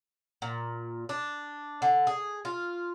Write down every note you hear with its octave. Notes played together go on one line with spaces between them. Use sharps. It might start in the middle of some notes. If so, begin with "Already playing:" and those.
A#2
D4
D3
G#4
F4